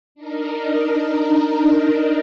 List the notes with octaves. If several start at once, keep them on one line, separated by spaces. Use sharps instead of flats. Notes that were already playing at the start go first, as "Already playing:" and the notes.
D4 D#4 A#4